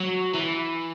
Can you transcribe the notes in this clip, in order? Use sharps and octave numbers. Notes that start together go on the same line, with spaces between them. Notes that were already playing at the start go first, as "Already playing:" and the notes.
Already playing: F#3
E3